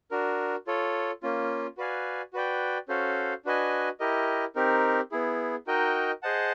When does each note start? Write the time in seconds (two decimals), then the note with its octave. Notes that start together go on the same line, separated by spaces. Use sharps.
0.11 D4 F#4 A#4
0.67 F4 A4 C#5
1.23 A#3 C#4 F4
1.77 F#4 B4 D5 F5 G#5
2.33 F#4 B4 D5 G5
2.88 C#4 F#4 A4 C5 F5
3.45 D4 F#4 B4 D#5 G#5
4.00 E4 G4 A#4 D#5
4.55 C4 D#4 G4 A#4
5.11 B3 E4 G#4
5.67 D#4 F#4 A#4 D#5 G5
6.23 G#4 C5 D#5 F#5 A5